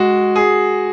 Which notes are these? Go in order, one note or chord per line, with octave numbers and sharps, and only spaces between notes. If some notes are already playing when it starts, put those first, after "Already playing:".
Already playing: G#3 F#4
G#4